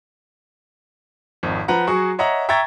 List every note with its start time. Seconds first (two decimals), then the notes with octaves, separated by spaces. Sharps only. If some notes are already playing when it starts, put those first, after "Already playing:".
1.43 G#1 F2
1.68 F3 B4 F#5 A#5
1.87 F#3 F#4 G#4 C#6
2.19 C#5 D#5 E5 F#5 A#5
2.49 E5 G5 A#5 C#6 G#6 A6